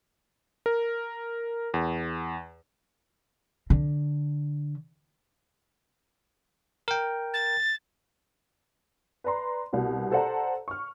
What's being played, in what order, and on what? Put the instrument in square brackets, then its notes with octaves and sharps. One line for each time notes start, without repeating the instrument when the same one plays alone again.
[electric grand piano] A#4
E2
[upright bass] D3
[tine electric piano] A#4 G5
[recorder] A6
[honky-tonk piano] B4 D5 A#5 C6
C2 B2
A4 C5 D5 F#5 A5 A#5
C#6 F6